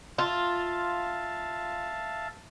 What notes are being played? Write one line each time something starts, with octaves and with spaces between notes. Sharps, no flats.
F4 E5 F5 A5